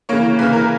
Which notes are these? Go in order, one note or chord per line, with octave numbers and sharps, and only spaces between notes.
C#3 E3 A#3 C#5
C#3 E3 A#3 B4
A#4